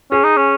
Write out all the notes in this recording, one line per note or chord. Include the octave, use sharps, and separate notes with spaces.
C#4 G#4
D#4
C#4